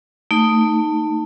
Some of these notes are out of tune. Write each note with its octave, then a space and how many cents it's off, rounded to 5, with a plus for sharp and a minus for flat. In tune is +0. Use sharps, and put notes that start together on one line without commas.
A3 +20 D#4 +0